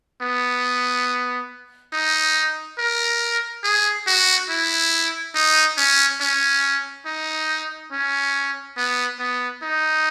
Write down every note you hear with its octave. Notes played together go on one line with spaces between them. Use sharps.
B3
D#4
A#4
G#4
F#4
E4
D#4
C#4
C#4
D#4
C#4
B3
B3
D#4